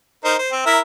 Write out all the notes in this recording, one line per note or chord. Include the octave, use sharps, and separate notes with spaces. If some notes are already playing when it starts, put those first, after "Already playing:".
D#4 A#4 C5
C5
C4
E4 A#4 E5